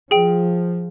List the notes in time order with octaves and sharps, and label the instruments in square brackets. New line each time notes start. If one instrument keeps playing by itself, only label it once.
[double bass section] F3 [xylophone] G#4 G5